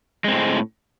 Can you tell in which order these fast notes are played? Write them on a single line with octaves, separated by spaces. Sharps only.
G#3 C4 A2